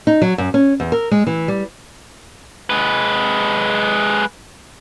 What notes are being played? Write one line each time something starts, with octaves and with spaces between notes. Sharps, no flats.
D#4
F#3
F#2
C#4
E2
A#4
G#3
E3
G3
G#3 B4